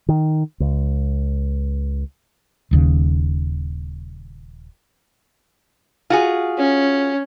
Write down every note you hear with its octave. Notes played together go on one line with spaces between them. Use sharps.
D#3
C#2
D#1 D#2 C#3
F4 F#4 G#4
C#4